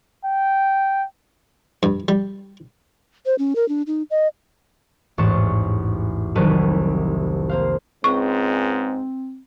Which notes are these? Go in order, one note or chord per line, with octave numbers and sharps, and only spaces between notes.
G5
G2
G3
C5
C#4
A#4
D4
D#4
D#5
A1 E2 G#2 C#6 A6 E7
F1 C2 D#3 F#3 B4 D#7
A#3 C5 F5
C#2 G#2 C4 C#6